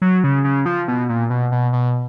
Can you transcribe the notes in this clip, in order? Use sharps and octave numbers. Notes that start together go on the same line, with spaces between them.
F#3
C#3
C#3
F3
B2
A#2
B2
B2
B2